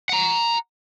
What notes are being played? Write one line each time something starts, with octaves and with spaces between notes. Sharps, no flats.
F#5 A#5